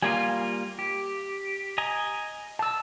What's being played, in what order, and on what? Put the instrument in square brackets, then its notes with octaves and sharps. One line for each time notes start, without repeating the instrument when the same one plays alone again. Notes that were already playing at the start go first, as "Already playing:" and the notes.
[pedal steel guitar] G3 A#3 F4 [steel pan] G#5
[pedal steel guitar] G4
D#5 G#5 A#5
[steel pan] A5 E6